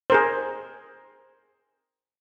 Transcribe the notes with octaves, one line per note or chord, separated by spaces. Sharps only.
G#4 A#4 C5